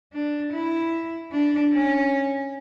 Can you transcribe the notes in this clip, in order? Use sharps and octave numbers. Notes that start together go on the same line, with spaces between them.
D4
E4
D4
C#4